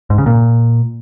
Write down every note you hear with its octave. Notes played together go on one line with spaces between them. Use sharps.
G#2
C#3
A#2